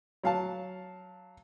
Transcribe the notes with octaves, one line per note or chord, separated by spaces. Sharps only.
F#3 F5 A5